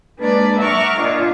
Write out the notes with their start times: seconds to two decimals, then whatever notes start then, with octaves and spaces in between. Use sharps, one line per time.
0.18 G#3 A#3 D4 B4 D5
0.59 E5 F#5 A#5 C#6 D6 F6
0.99 A#2 D4 F4 D#5 F5